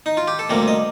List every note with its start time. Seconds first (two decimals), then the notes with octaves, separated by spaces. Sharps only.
0.06 D#4
0.17 F4
0.28 G4
0.39 A4
0.50 D2 C3 G3 A#3 A#4
0.68 D#5